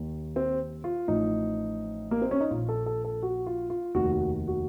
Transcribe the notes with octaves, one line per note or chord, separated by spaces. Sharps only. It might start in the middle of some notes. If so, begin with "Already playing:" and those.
Already playing: D#2 D#3
C4
F4
A1 A2 F3 D#4
A#3
C4
C#4
D#4
A#1 A#2 F3 F4
A4
A4
A4
F#4
F4
F4
F1 D#2 D#3 F#4
F#4
F#4